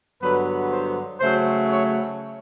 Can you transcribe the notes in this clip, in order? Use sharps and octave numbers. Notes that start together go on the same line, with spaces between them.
G2 D3 F#3 B3 B4
C5
C#3 F#3 A3 C5
C#5